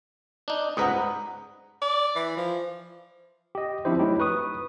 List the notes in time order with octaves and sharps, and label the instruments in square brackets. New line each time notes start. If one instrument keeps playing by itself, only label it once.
[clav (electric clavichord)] D4 D#4
[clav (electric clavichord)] C#2 G#2 B4 [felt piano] F#5 A#5 D#6
[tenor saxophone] D5
E3
F3
[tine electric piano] G4 D#5
F3 C4 D4 E4 G4 C5
F#3 A3 D#4 E4 G4
B4 C#6 D#6